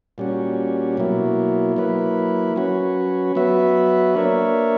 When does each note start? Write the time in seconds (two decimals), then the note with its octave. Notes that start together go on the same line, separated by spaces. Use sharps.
0.18 A#2 G3 C#4 F#4
0.97 B2 F#3 A#3 E4
1.76 F#3 A#3 E4 B4
2.56 F#3 C#4 F#4 B4
3.35 F#3 B3 F#4 B4 E5
4.14 A#3 D4 A#4 C#5 E5